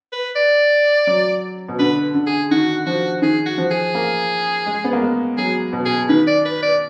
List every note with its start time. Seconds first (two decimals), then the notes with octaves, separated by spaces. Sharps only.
0.12 B4
0.35 D5
1.07 F#3
1.68 B2
1.79 D3 B4
2.14 D3
2.27 G#4
2.51 D#3 F#4
2.86 F3 F#4
3.22 D#3 G#4
3.46 F#4
3.58 F3
3.71 G#4
3.95 A#3
4.66 G#3
4.84 B3
4.93 A#3
5.02 G#3
5.37 F#3 G#4
5.73 B2
5.85 G#4
6.09 D#3 B4
6.27 D5
6.45 B4
6.62 D5